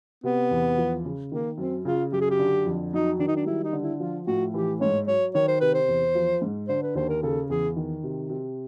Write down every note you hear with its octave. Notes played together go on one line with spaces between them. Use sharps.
C3 B3
E2
F3
C#3
D#3 A#3
F#2 C4
C#3 F4
F#2 G4
G#4
G4
D3
F2
F#3 D#4
D#3 D4
D#4
D4
G3 E4
D#4
D3
E4
F3 F4
A2 F#4
E3 G4
G#2 C#5
F#3 C#5
D#3 C#5
C5
C3 B4
C5
E2
F3
G#2
D3 C5
B4
D#2 C5
A#4
C#3 A4
E2 G#4
D#3
C3
C3